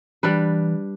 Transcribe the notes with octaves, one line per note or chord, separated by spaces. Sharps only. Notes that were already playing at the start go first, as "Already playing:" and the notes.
E3 G3 D4 B4